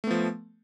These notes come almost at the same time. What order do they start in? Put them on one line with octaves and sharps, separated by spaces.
A3 B3 F3